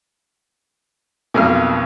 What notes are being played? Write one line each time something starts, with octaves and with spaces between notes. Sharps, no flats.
B1 F2 B2 A#3 B3 F6